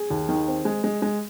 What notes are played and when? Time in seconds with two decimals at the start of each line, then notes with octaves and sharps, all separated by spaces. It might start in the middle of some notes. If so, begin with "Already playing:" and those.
Already playing: G#4
0.10 D#2
0.29 D#3
0.48 C4
0.65 G#3
0.84 G#3
1.02 G#3